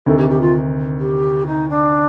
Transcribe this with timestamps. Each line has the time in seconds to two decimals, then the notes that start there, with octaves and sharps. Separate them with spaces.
0.06 D2 C3 D#3 A4
0.18 G4
0.30 G4
0.41 F4
1.00 G4
1.46 D#4
1.69 D4